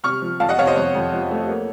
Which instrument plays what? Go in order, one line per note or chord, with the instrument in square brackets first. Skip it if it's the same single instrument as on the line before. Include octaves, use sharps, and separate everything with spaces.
[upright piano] C3 C#6 F6
F3
F2 F5 A5
D#5 F#5
C3 C#5 F5
C5 D#5
F2 C#5
F2
F3
A3
A#3